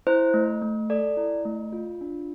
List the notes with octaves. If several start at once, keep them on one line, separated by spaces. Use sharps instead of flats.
E4 C5
A3
A3
A4 D5
E4
A3
F4
D4